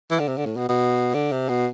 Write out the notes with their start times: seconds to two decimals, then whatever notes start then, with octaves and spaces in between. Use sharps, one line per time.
0.11 E3
0.20 D3
0.28 C3
0.37 D3
0.45 A2
0.57 B2
0.69 B2
1.14 D3
1.32 C3
1.49 B2